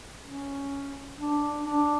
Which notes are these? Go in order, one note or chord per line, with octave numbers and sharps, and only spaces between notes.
C#4
D4
D4